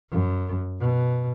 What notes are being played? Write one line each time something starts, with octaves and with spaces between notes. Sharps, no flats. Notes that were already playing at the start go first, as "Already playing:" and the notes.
F#2
B2